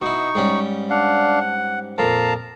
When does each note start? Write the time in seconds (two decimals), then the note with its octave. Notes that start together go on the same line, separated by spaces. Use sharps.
0.02 B2 D#4 E4 C#6
0.35 G#2 G3 C#4
0.90 D4 F5 F#5
1.41 F#5
1.98 F2 A#2 F5 A5 A#5